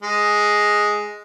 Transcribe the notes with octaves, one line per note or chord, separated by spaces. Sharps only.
G#3